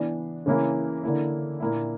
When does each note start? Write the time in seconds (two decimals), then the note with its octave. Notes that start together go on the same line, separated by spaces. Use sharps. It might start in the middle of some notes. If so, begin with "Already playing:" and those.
Already playing: E3 B3 D4
0.46 C#3 E3 A#3 E4
1.04 D3 A#3 E4
1.60 A#2 A#3 E4